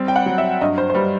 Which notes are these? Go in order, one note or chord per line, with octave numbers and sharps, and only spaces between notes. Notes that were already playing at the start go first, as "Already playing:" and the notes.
Already playing: G3 C4
G5
F#5
F#3
E5
G2 D#5
C5
C5
G3 B4